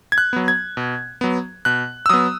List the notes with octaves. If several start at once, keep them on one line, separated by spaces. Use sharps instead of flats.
G#6
F#6
F#3 B3
G#6
B2
F#3 B3
B2 F#6
E6
F#3 B3 D#6